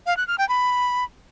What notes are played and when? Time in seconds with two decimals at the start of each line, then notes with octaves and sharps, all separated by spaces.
0.06 F5
0.17 F#6
0.28 F6
0.38 G5
0.49 B5